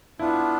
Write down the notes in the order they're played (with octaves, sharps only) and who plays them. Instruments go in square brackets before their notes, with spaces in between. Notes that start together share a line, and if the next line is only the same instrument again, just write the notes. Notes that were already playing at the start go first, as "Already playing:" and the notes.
[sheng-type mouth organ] B3 D4 F4 [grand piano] E4